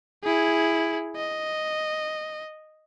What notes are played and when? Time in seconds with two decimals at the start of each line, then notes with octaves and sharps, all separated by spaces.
0.23 E4 G#4
1.16 D#5